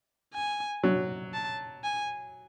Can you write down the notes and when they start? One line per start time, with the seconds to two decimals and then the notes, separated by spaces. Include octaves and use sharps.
0.34 G#5
0.83 F#3
1.34 A5
1.84 G#5